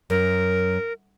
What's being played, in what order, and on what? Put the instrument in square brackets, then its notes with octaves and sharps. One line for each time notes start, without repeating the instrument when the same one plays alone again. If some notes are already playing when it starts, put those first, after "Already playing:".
[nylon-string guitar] F#2 [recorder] A#4